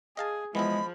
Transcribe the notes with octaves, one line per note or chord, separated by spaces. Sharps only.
G#4 D#5 F5 A5
E3 F3 G#3 B3 E4 B5